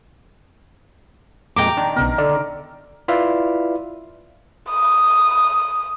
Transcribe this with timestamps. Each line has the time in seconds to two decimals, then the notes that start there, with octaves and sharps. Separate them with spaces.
1.56 F2 A#2 G#3 G5 A#5 D6
1.77 D#3 D4
1.96 B1 C#3 B3 A#4
2.18 D3 D5
3.08 E4 F4 B4 D5 E5 F5
4.70 D#6